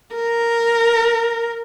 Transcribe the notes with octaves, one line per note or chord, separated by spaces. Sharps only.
A#4